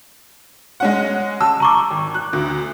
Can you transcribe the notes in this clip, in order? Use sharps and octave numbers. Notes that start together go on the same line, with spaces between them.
G#3 C#4 F#5
A5 E6
A#5 C#6 D6
G#1
F#6
D2